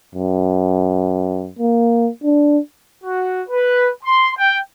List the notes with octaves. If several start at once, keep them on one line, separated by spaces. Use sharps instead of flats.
F#2
A#3
D4
F#4
B4
C6
G5